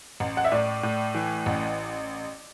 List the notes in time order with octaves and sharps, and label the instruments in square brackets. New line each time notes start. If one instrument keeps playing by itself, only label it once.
[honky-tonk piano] A1
F#5
E5
A2 D5
A2
E3
A1